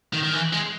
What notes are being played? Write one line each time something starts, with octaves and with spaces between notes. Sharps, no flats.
D#3
D#3
E3
G#3